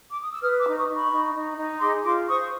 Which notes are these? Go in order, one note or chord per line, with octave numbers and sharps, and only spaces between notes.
D6
D#6
E6
B4 D#6 F6
D6 E6
D#4
C#6 D#6
D#4
B5 C#6
D#4
D#4
D#4
G#4 C6 D6
F4 C6 D6
C5 C#6 D#6